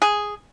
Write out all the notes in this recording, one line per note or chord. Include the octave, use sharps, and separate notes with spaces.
G#4